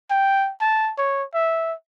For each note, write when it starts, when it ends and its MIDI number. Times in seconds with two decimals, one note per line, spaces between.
0.10 0.52 79
0.61 0.92 81
0.98 1.24 73
1.34 1.74 76